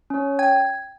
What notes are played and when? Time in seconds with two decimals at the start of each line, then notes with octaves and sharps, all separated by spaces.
0.10 C#4 C#5
0.39 G5 G#6